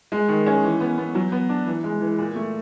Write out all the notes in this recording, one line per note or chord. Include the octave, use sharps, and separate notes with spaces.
G#3
D#3
C#4
E3
B3
B3
F#3
B3
D4
E3
G#3
E3
A#2
A3